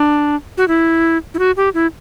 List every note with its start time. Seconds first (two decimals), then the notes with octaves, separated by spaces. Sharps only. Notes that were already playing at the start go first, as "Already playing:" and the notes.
Already playing: D4
0.57 F#4
0.68 E4
1.34 E4
1.39 F#4
1.57 G4
1.74 E4